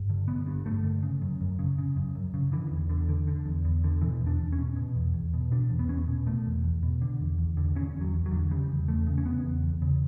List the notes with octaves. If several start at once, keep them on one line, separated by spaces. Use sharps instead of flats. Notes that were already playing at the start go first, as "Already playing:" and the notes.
Already playing: G2
D3
D3 B3
G2
G2 A3
D3
C#3
F#2
F#2
C#3
C#3
F#2
F#2
C#3
D3 E3
E2
E2 D3
D3
D3
E2
E2
D3
B2 E3
E2
D4
E2
C#4
B2
B2
E2
E2
B2
B2 D4
E2
B3
E2 C#4
B2
B2 A3
E2
E2
B2
D3
E2
E2
D3
D3 C#4
E2
F#3
E2
F#3
D3
C#3 G3
E2
E2 A3
C#3
C#4
C#3 B3
E2
E2
C#3